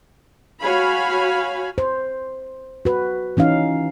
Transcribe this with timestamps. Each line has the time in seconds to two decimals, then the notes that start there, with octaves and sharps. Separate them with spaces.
0.61 F#4 C#5 F5 G#5 B5
1.78 C5
2.85 F#4 B4
3.37 E3 C#4 D#4 F5